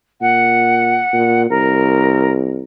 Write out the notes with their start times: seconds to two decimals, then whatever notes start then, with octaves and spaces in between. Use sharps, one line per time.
0.21 A#2 F#5
1.13 A#2
1.50 C2 A#4